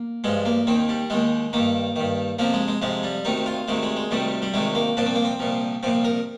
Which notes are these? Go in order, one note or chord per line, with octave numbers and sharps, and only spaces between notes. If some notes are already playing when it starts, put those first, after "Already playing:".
Already playing: A#3
G2 F3 G#3
A#3
D#2 D#3 C4
G3
D#2 D#3 G#3
G2 D#3 A#3
G2 D#3
F2 C3 F3 A#3
G#3
G#3
F2 C3 F3 G#3
G3
D2 C3 D#3 D#4
F4
D2 C3 D#3 G#3
G#3
G#3
D2 C3 D#3 G3
G3
D2 C3 D#3 G#3
A#3
C2 A#2 F3 D4
C4
A#3
C4
C2 A#2 F3
C2 A#2 F3 C4
A#4